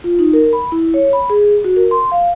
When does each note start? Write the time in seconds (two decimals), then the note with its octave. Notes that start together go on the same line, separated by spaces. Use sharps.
0.04 F4
0.19 D#4
0.33 A#4
0.53 B5
0.72 E4
0.94 C#5
1.13 B5
1.30 G#4
1.64 F#4
1.76 A#4
1.91 C6
2.12 F5